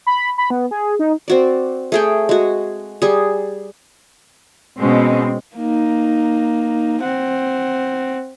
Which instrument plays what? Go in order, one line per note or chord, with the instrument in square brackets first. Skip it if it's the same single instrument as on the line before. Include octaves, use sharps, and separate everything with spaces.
[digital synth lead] B5
B5
B3
G#4
D#4
[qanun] C4 F#4 D5
A3 G#4 G5
G#3 F#4
G3 G#4
[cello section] B2 G#3 C4 C#4
[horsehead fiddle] A#3 D#4
C4 F#5